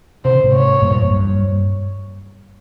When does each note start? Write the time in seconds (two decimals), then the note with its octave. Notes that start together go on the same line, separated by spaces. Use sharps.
0.25 C3 C5
0.35 C#3
0.44 G#2 C3
0.53 C#5
0.82 G2 A#2
1.01 F2
1.10 G2
1.39 G2